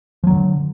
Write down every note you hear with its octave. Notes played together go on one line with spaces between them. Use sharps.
D3 F3 F#3